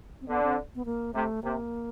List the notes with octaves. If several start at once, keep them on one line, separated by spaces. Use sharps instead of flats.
C4
D3 B3
C4
B3
A#3
C3 A3
C3 A#3